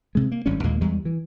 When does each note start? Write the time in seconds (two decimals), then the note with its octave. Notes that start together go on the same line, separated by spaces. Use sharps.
0.15 C3 G#3
0.32 A#3
0.46 G#1 G2 G3 C#4
0.64 D#2 A#2 G#3 A#3
0.81 E2 G3 G#3
1.05 E3